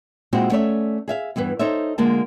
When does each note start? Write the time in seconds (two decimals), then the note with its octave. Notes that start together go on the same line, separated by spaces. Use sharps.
0.33 A#2 G#3 C4 E4 F#4
0.51 A3 C#4 A4 C#5 D5 E5
1.08 G#4 E5 F5
1.36 E2 G2 E3 B4
1.59 D#4 A4 C5 C#5 E5
1.98 D3 G#3 A#3 F4 A5